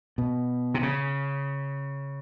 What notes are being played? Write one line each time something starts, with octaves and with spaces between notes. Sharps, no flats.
B2
C3
C#3